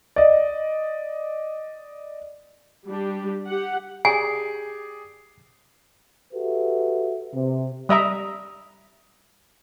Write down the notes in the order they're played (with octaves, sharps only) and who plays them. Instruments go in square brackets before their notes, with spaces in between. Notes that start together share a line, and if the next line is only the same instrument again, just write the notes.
[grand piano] D5 D#5
[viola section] G3 D4 G4
G4 F#5
[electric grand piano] G4 G#4 D5 [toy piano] G#5 [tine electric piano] C7
[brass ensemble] F#4 G4 A4 B4 E5
C3
[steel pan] G3 D#5 E5 A#5